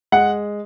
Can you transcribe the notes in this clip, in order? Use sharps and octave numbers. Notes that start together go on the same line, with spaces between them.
G#3 F#5